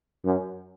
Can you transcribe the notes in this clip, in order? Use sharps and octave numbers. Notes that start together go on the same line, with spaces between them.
F#2